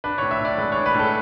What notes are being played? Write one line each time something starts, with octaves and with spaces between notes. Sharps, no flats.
D4 B4
A2 C#5
E5
A2 D5
G#3 B4
D4 C#5
B4
A2 A4